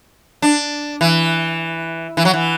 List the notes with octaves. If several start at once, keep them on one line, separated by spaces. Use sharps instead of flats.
D4
E3
E3
F#3
E3